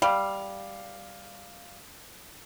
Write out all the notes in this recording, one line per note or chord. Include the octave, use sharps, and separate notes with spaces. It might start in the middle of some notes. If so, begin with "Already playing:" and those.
G3 F5 D6